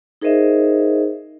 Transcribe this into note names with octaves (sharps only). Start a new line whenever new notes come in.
D#4 G#4 A#4 C5 D#5 E5